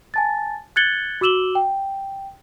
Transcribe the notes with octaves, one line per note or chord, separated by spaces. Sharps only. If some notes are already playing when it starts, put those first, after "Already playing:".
G#5 A5 A6
F#6 G#6 A6 C#7 F#7 G7
F#4 D6 E6 E7 F#7 G7
G5